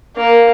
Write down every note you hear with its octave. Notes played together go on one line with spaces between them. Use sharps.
A#3